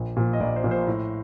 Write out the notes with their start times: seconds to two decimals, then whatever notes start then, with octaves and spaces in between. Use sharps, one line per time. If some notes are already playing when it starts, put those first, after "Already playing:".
Already playing: A#1
0.17 A#2 F3
0.33 D#5
0.40 A#1 D5
0.56 C5
0.64 A#2 F3
0.71 C5
0.87 A2